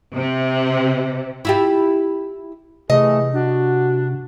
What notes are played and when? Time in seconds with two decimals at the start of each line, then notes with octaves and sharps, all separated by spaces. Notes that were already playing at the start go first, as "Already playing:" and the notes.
0.14 C3
1.45 E4 F4 G4
2.90 C3 E3 A3 G#4 D#5
3.33 D4 F#4